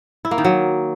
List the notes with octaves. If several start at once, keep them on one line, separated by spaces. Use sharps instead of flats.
E4
A#3
D#3
F#3